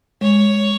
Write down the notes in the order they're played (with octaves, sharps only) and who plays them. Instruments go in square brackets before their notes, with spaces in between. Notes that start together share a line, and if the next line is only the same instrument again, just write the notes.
[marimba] G#3 [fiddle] C#5